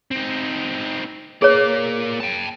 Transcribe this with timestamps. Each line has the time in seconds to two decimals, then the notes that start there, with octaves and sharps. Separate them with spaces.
0.11 C4 D#4
1.42 A#3 G#4 B4 C#5 D5
2.21 G5 A5